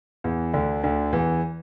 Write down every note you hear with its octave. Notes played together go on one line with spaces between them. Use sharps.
E2 E3
D2 D3
D2 D3
E2 E3